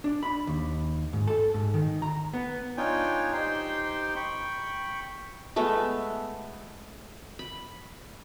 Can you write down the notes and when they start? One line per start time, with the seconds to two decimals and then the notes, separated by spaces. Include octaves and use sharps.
0.04 D4
0.23 B5
0.47 D#2
1.13 G#2
1.27 A4
1.54 G#2
1.74 D#3
2.02 A#5
2.33 B3
2.77 D4 D#4 F4 C#5 G5 G#5
3.33 D#4 G4 C5 G5 C6
4.16 G5 B5 C#6
5.56 G#3 A3 B3 E5
7.39 B5